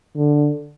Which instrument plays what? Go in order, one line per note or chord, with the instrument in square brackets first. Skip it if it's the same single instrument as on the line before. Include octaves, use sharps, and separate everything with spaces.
[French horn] D3